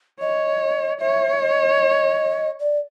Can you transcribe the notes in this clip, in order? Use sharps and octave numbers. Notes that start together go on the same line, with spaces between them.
C#5 D#5
C#5 E5
D#5
D5